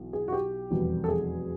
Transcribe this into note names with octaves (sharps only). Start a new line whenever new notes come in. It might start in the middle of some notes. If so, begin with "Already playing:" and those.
Already playing: B1 E3
G#4
F#4
G4
F1 E2 B2 G3
A4
G#4